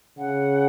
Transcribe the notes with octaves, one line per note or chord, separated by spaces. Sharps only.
C#3 F#5